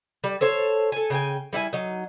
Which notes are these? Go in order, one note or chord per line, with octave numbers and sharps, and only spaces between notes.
G3
A4 C5 C#5 A5
A4 G#5
C#3 G5 G#5
G3 E4 F5 G#5
F#3 D#4